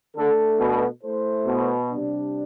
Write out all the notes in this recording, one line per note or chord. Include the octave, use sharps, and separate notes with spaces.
D3 A3 D4 A4
B2
A3 E4 A4 C5
B2
C3 G3 D4